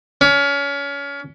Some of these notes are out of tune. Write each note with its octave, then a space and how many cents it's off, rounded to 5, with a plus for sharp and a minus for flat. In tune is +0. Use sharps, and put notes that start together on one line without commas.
C#4 +30